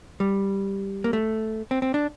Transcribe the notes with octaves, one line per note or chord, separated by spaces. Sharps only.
G3
A#3
A3
C4
C4
D4